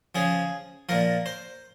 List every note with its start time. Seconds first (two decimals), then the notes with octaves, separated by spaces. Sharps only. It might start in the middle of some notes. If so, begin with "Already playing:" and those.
0.15 C#3 F3 G#4
0.89 A#2 F3 A#4
1.26 C5